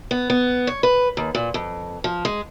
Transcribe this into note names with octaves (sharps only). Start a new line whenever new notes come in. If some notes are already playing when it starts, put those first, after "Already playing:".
B3
B3
C#5
B4
D#2
A#2
F2
F3
G#3